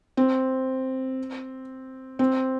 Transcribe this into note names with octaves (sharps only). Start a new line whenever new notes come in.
C4
C4